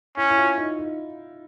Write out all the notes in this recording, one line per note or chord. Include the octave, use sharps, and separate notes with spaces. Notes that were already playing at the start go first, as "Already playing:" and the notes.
C#4 E4
E4
F4
D#4
D#4